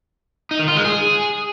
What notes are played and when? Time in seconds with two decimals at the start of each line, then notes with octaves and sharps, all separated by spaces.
0.51 D#4
0.59 D#3
0.68 F4
0.76 G#3
0.85 G#4